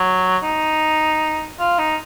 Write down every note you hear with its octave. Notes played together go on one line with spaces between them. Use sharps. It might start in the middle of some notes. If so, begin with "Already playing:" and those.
Already playing: F#3
D#4
F4
D#4